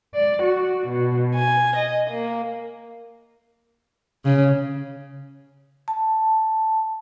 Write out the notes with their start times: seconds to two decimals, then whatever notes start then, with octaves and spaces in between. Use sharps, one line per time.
0.14 D5
0.43 F#4
0.88 B2
1.35 G#5
1.78 D#5
2.09 A#3
4.25 C#3
5.88 A5